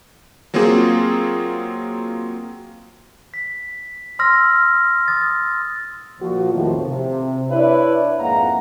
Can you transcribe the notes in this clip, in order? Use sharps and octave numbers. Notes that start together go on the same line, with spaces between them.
F#3 A#3 C4 F4 G#4
B6
C6 E6 F6 A#6
D#6 A6
A#2 F3 F#4
E2 A2 C3 D#3 F3
C3
D4 E4 B4 C#5 D5 E5
F2 G#2 A#3 F5 F#5 A#5